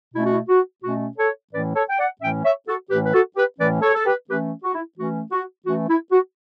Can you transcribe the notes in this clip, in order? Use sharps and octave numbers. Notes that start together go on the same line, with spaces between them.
B2 A3 C#4 E4
F#4
E4
F#4
B2 A3 C#4 F#4
A4 C#5
A2 E3 A3 C#4 B4 D5
A4 C#5
G5
D5 F#5
A2 E3 A3 C#4 E5 G5
C#5 E5
F#4 A4
A2 E3 A3 C#4 G4 B4
B4
F#4 A4
G4 B4
A2 E3 A3 C#4 B4 D5
A4 C#5
A4
G4 B4
E3 A3 C#4 G4 B4
F#4
E4
E3 A3 C#4 F#4
F#4
E3 A3 C#4 F#4
E4
F#4